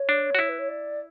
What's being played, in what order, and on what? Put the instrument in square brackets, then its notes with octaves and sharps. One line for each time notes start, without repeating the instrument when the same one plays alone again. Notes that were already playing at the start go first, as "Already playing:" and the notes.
Already playing: [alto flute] C#5
[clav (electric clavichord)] D4
F#4
E4
[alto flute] B4
C#5
D5